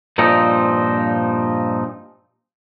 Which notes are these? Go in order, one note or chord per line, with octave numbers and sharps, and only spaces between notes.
G2 A#2 F3 C4 D#4